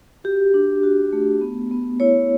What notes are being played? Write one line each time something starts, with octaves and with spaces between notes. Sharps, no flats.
F#4 G4
D4
F#4
A3
B3
B3
E4 C#5